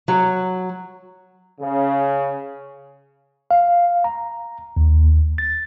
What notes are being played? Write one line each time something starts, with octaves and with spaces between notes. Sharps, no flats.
F#3
C#3
F5
A#5
D#2
A6